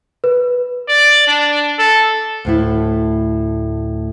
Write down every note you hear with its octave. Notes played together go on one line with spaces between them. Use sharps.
B4
D5
D4
A4
D2 A2 E4